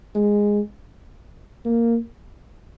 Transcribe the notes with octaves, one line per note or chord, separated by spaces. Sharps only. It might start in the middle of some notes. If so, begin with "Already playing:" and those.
G#3
A#3